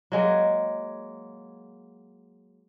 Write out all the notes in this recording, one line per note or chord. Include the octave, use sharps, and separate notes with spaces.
F#3 G#3 A#3